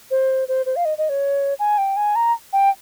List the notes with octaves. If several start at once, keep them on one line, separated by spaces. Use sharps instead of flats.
C5
C5
C5
F5
D#5
D#5
C#5
G#5
G5
G#5
A#5
G5